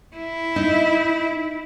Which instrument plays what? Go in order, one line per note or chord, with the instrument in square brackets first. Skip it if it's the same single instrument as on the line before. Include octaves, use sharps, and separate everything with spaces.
[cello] E4
[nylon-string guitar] D#4